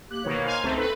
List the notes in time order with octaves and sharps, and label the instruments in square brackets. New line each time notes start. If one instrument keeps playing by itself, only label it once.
[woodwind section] A#3 G4 [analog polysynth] F#6
[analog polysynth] B2 D#3 A#3 [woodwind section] C#5
[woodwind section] C5 A#5 C6 [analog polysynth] F5 G#5 F6
[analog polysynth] C#2 A3 C4 [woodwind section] D#4 C5
[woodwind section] D#4 A4 [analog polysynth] B4